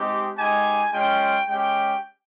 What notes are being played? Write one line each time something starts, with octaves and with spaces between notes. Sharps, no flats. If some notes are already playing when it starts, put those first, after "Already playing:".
Already playing: G#3 C4 D#4 G4
G#3 D#4 G4 G#5
G#3 C#4 F4 G5
G#3 C#4 G4 G5